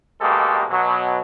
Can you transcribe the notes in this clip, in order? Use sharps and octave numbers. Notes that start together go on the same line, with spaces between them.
A1 B2 G#3 A#3 G4 A4
B2 F#3